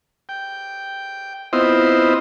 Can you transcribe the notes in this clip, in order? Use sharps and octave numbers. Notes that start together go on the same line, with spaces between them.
G5
B3 C4 E4 F4 C5 D#5